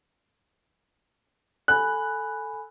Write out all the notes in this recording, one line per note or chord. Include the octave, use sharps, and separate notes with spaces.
A4 G#5 B5 F#6